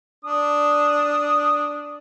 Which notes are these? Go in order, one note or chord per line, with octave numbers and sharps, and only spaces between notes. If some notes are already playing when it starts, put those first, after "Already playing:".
D4 D#6